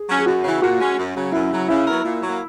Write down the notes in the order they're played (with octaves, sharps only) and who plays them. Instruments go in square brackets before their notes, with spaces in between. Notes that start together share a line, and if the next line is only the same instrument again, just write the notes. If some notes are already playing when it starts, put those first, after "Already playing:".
Already playing: [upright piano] G#4
[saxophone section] F#3 C#4
[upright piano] G#4
[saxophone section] F#2 [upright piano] F#4
[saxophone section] C#3 E3
[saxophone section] A#2 [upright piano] F#4
[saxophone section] G#3 C#4
F#2
C#3 F#3
[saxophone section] F#2 [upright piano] E4
[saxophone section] C#3 F#3
[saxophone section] C#3 [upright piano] E4
[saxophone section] F#3 B3 F#4 A#4
A#2
F#3 A#3